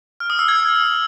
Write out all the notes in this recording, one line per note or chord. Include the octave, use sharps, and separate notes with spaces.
F6
D#6
E6
G#6